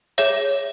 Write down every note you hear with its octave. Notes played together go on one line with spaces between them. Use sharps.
G#4 C#5 E5